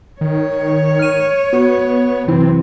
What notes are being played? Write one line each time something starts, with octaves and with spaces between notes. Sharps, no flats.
D#3 C#5
F6 D#7
B3 F#4
F#2 C3 E3 C4 E4